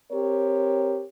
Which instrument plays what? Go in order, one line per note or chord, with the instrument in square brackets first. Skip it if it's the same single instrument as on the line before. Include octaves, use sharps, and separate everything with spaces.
[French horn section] C4 G4 A#4 C#5